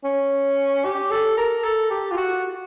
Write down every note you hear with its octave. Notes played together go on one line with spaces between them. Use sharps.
C#4
G4
A4
A#4
A4
G4
F4
F#4